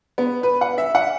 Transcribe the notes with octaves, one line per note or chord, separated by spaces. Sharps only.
B3
B4
F#5
E5
F#5